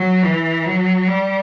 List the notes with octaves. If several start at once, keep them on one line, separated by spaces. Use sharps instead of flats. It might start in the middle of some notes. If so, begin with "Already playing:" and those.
Already playing: F#3
E3
F#3
G3